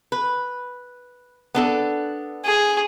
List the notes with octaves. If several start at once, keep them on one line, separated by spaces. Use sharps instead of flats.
B4
B3 D4 A4
G#4